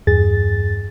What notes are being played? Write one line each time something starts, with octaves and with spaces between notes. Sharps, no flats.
E2 G2 G#4 A6